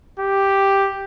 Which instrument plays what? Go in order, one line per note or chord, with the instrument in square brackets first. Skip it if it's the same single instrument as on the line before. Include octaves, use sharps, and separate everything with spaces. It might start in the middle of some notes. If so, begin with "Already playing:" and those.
[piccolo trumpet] G4